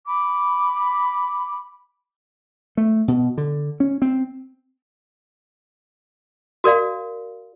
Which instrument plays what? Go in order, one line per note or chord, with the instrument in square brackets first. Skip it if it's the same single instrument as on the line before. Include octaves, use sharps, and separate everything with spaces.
[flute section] B5 D6
[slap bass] A3
B2
D3
C#4
C4
[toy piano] F#4 A#4 D5 F5